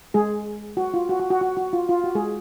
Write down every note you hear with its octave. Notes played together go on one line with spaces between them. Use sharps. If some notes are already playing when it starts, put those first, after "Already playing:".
G#3 G#4
F#4
F4
F#4
F#4
F#4
F#4
F#4
F4
F4
F#4
G#3 G#4